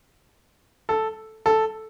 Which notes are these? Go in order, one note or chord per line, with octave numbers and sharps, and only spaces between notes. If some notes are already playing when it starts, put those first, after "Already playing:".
A4
A4